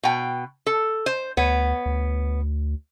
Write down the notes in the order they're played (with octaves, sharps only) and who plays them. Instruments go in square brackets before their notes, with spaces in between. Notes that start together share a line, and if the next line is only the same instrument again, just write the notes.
[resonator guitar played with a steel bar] B2 G5
A4
C5
[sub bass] D2 [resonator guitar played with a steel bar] B3 C#5
[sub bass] D2